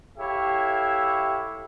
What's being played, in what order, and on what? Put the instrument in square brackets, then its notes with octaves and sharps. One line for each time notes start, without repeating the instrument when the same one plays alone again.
[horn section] E4 G4 A4 C#5 E5 F5